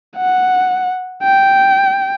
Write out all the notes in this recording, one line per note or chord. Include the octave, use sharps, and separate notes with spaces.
F#5
G5